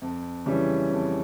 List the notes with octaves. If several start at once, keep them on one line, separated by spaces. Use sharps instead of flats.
F2
C#3 E3 G3 C#4
F2